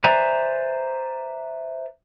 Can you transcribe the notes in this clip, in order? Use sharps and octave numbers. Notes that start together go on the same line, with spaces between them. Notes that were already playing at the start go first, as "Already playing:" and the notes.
B4 C5 D5 E5 G#5 A#5